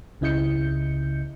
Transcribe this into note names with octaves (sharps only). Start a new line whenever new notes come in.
C#2 C#3 E4 D#5 G6 C#7